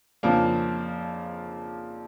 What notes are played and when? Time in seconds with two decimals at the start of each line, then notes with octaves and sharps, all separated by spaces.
0.23 F2 C#3 F3 A#3 D4